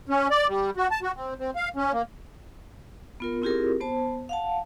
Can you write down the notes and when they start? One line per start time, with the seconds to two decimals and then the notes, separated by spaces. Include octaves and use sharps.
0.09 C#4
0.30 D5
0.48 G3
0.77 F#4
0.91 A5
1.02 F#4
1.16 C4
1.39 C4
1.56 F5
1.76 C#4
1.92 A#3
3.20 B3 F4 A#4
3.42 C4 E4 F4 G4 G#4 A#4
3.81 B3 C5 A5
4.29 F5 F#5 A5